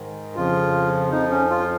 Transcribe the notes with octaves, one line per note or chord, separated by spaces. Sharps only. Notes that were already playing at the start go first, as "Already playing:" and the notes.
Already playing: G#2 D#3
F2 C#3 F3 F4
F2 F3 D#4
C#4
F4